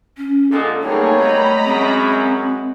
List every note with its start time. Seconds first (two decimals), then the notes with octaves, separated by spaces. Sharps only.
0.17 C#4
0.52 A#2 D3 G#3 A4
0.82 C3 F#3 G3 A3 A#3 D#4 G#4 C#5
1.21 A3 D#5 A#5 B5
1.64 F#2 G#3 C4 F#4